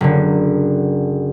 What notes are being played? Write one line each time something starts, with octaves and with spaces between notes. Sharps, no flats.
F#1 D3